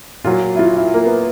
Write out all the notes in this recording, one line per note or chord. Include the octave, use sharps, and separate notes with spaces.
A#2 F#3 F4
E4
F4
E4
A#3
B3